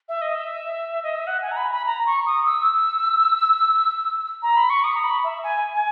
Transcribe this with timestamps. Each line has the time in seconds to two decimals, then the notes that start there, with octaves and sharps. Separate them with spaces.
0.09 E5
0.21 D#5
0.35 E5
1.03 D#5
1.16 E5
1.27 F#5
1.42 G#5
1.51 A#5
1.56 B5
1.72 B5
1.86 A#5
2.06 C#6
2.26 D#6
2.46 E6
4.42 A#5
4.56 B5
4.70 C#6
4.84 D#6
4.95 A#5
5.03 B5
5.24 E5
5.43 G#5
5.73 G#5